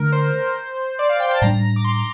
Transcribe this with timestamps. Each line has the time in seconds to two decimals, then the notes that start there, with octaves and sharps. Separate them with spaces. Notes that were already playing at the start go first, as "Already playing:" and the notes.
Already playing: D3 A3 D4 A#4
0.12 C5
0.99 D5
1.09 F5
1.20 G5
1.31 A5
1.42 A2 G3 D4 A#5
1.76 D6
1.84 C6